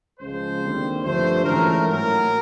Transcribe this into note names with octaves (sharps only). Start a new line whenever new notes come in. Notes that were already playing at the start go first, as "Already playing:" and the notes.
C#2 C#3 F3 G#3 C5
D#2 D3 G3 C4
G2 D3 F3 A3 C5
G#2 E3 A3 C#4 A#4
A2 F#3 A#3 A#4